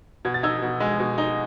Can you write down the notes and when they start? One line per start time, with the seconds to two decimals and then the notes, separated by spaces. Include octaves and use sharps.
0.25 B2 G#6
0.34 A6
0.43 D#4 E6 G#6
0.62 B2
0.80 G#3
0.99 B2
1.18 D#4